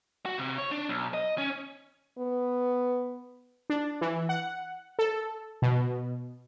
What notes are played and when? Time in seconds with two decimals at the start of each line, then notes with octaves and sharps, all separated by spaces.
0.26 F#4
0.38 C3
0.58 C#5
0.71 D4
0.89 B1
1.14 D#5
1.38 C#4
2.18 B3
3.70 D4
4.01 E3
4.29 F#5
4.99 A4
5.62 B2